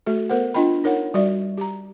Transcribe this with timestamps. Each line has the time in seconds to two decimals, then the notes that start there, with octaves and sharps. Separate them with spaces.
0.06 A3 F#4 A4
0.29 B3 A#4 C5 F#5
0.54 D4 F4 D#5 G5 B5
0.84 D#4 A#4 C#5 F#5
1.14 G3 F#4 D5 E5
1.58 G4 A#5